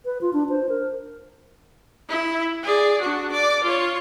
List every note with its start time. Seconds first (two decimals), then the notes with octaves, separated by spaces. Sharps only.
0.05 B4
0.21 F4
0.33 D4
0.50 C5
0.69 A#4
2.09 E4
2.63 G#4 D5
3.01 D4 F#4
3.31 D5 D6
3.63 F4 C#5